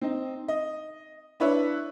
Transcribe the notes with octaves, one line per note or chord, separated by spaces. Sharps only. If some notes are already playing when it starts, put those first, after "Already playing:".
C4 D#4
D#5
D4 E4 B4 C#5 E5